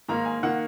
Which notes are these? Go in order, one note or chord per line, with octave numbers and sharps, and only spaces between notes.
G#2 D#3 A#3 A#5
G#5
D#3 A#3 F#5